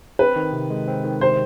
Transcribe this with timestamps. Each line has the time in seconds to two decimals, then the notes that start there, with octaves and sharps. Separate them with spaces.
0.19 C4 B4
0.36 D#3
0.53 C3
0.70 G#3
0.87 C4
1.04 D#3
1.21 C3 C5